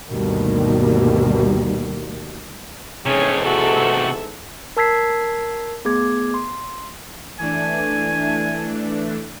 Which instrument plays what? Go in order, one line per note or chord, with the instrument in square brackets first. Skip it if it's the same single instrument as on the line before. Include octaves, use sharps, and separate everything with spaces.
[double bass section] D2 G2 B2 D#3 G3 A#3
[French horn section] E2 G#2 [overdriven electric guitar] C3 A3 [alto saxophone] C#4 [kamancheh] G#4 C#5
[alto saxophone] F#4 [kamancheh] A4 E5
[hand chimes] A#4 A5 E6 G#6 B6 C7
A3 B3 G#4 D6 G#6
C6
[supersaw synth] E3 A3 D4 [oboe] G#5